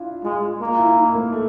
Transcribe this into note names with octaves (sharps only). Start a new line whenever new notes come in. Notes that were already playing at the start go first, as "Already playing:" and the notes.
Already playing: D4 E4 F4
G#3 F4
A#3 F4
E4
D#4
A#3
A3